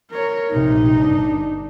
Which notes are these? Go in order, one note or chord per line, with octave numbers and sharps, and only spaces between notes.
A#4 C#5
A#1 C3 D#4
G1 D4